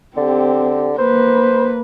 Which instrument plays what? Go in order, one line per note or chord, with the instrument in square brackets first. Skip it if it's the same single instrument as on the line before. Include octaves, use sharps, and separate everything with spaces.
[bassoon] D3 [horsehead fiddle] C4 G4
[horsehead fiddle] A#3 B4 [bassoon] C5